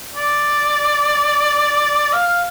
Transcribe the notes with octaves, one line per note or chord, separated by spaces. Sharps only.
D5
F5